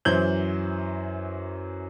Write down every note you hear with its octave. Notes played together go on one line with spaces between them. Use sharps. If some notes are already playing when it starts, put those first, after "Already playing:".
F#2 E3 F#3 C5 G6 F#7